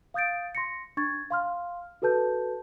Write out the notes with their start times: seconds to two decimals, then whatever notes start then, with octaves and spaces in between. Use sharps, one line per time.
0.14 F5 D#6 G6 A6 D7
0.55 C6 A#6 C#7
0.97 D4 C#6 G#6 A6
1.31 F5 C6 F6
2.02 F#4 A4 B4 A5 G6